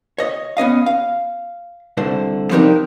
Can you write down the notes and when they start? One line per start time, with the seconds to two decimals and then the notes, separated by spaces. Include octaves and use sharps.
0.18 C#5 D#5
0.57 B3 C#4 D#5 F5
0.86 F5
1.97 C2 D3 C5
2.51 F3 C4 D4 D#4 G4 A#4